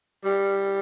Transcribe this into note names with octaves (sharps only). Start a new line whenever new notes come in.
G3